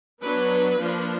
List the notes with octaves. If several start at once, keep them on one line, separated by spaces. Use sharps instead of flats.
F#3 B3 D4 B4
F3 A#3 D4